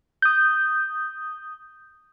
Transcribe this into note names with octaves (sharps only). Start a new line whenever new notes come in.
D#6 G6